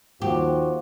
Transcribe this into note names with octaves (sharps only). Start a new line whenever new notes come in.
D#2 F3 F#4 G4